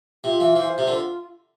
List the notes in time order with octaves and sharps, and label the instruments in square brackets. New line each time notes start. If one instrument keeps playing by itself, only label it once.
[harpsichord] C3 [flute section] F4
[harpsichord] E3 [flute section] F5
[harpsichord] E3 [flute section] C5
[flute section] F4
[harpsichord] C3
[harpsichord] D3 [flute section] F4